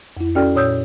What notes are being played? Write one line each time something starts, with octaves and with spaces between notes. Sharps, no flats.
F2 E4
C#4 F#4 A4 D5 G5 F6
A#2 C#5 D#6 E6 G6